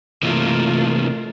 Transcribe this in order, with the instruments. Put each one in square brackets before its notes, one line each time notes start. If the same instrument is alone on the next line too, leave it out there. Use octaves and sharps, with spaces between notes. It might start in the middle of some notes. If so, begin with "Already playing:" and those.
[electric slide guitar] C3 E3 A#3 [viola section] A3 F4 A#4